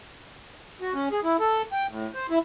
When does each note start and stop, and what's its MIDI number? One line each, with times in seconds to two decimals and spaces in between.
0.81 0.93 66
0.94 1.09 61
1.12 1.20 68
1.24 1.37 64
1.40 1.62 69
1.72 1.87 79
1.89 2.10 45
2.14 2.27 72
2.30 2.39 64